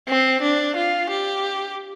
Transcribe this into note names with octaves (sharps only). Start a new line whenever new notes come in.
C4
D4
F4
G4